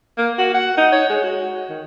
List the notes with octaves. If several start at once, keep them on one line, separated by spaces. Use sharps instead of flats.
A#3
F#4
F#5
D#4
C#5
G#3
F#4
D#3